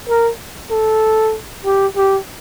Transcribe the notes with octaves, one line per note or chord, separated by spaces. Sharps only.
A#4
A4
G4
G4